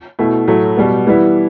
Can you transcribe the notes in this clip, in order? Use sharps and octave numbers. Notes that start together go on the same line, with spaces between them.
B2 A3 E4
A2 F#3 A3
B2 G3 B3
E3 G3 B3 E4